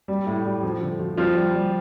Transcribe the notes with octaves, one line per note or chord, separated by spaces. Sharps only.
G3
A2
G3
F3
D3
F3
F3 G3 F4
G3
G3